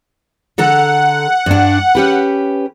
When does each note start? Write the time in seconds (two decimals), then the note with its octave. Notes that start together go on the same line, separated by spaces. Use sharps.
0.58 D3 A4 F#5 A#5
1.46 G2 D4
1.95 C#4 G4 B4